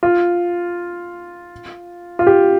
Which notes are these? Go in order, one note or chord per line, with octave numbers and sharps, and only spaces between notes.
F4
F4
G4